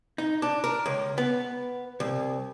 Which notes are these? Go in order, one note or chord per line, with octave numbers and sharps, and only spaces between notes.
D#4
D4
A#4
C#2
B3
C2